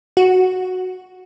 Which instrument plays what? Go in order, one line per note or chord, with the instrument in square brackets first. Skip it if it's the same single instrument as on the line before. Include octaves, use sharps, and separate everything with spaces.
[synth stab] F#4